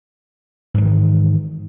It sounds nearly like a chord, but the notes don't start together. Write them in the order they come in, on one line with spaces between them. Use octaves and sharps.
G#2 F#3 E3 D#3